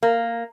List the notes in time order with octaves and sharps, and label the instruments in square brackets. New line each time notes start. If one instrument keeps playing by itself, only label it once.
[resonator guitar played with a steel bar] A#3